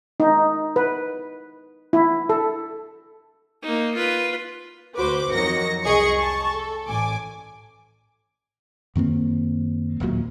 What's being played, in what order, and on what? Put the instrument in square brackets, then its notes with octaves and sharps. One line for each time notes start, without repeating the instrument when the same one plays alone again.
[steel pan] D#4
B4
E4
A4
[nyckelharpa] A#3 D#4
F4 B4
[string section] D2 F#4 B4 C5 D6
F2 D#3 F#3 D#4 A#6 C#7
C2 G#4 D#5 C#6 C#7
A5 C#6
A4
A1 G#5 D6
[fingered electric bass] F#2 D#3 A#3 C4
D1 D#2 A#2 F#3